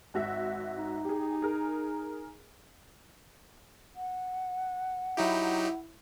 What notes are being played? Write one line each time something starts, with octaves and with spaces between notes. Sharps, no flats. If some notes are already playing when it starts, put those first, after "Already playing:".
G#1 F#4 E5
D#4
G4 G#4
G#4 A#4
F#5
F#3 D#4 E4 G4